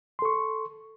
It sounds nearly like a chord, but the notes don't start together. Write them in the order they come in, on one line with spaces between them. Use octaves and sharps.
C6 A4 C#6